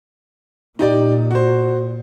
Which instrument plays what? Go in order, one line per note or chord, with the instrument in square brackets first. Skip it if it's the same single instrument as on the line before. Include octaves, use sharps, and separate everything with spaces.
[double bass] A#2 [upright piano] D#4 G4 D5
[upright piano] F#4 C5